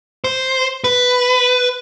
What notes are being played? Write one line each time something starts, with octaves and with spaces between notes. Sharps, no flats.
C5
B4